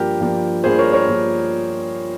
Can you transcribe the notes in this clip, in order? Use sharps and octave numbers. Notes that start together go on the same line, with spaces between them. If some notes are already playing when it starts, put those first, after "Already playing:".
Already playing: G2 F3 A#3 G4 A#4
G2 F3 A#3
G2 F3 A#3 G#4 C5
A#4 C#5
A#4 C#5
G2 F3 A#3